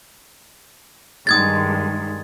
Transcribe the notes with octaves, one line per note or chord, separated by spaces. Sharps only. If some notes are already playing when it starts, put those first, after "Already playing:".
G2 D#3 G#3 D#6 G#6 A6